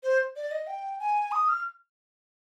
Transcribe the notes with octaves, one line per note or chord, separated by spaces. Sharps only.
C5
D5
D#5
G5
G#5
D#6
F6